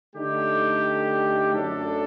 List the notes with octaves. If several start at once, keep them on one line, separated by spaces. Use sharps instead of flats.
D3 A3 D#4 G4
F#2 F#3 A3 D4 A4